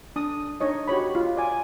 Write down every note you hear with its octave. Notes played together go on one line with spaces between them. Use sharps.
D4 D#6
D4 D#4 C#5 D#5
F#4 G4 C#5 B5
F4
D5 G#5